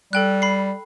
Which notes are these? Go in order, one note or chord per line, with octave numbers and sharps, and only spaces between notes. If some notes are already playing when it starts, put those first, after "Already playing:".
G3 A4 G5 F#6
B5 C7